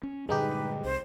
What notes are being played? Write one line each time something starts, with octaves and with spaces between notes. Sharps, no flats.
C#4
G2 A#2 D3 G#3 D#4 G4 B4
C2 C5